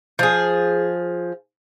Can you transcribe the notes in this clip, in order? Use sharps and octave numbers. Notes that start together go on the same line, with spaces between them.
F3 G#4